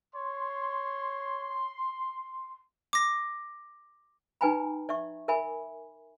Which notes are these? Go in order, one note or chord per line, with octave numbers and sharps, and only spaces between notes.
C#5 C6
D6 A#6
D#4 B4 G5 G#5 A#5 B5
D5 E5 C#6
A#4 E5 G#5 B5